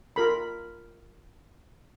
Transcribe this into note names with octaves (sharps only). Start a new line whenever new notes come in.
F4 A#4 B5